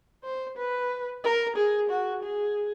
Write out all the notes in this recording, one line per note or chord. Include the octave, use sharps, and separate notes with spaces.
C5
B4
A#4
G#4
F#4
G#4